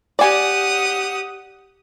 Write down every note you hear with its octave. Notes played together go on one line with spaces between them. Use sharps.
G4 D5 F#5 G#5 D#6